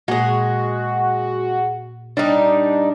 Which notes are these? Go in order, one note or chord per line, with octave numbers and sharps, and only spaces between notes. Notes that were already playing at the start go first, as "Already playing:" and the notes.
A#2 G#3 A#3 F#4 G#4
G3 D4 D#4